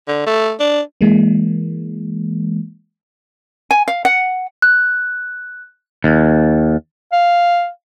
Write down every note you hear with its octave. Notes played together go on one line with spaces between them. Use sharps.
D3
A3
D4
E3 G#3 A#3
G#5
F5
F#5
F#6
D#2
F5